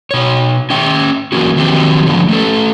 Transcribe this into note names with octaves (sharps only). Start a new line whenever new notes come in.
B2 C#5
C#4 E5 G5
E3 F#3 A#3 C#4 F#4
D#3 F3 F#3 C4 G4
D3 F3 B3
A3 C#4 A4